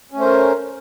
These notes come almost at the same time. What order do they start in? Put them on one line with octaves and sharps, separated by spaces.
C#4 A3 C5 A#4